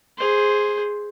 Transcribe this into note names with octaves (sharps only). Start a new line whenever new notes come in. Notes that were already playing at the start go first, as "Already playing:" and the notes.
G#4 C5